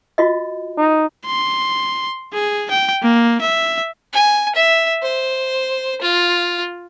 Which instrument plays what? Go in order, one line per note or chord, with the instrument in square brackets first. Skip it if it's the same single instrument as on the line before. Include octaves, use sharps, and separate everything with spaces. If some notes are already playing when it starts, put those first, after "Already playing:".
[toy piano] F4 F#4 D#5
[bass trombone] D#4
[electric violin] C6
G#4
G5
A#3
E5
[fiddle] G#5
E5
C5
F4